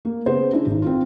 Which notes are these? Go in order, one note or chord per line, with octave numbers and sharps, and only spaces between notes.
A#3
C#3 B3 G#4 C5
D4 E4 G#4
G#1 G#2
C4 F4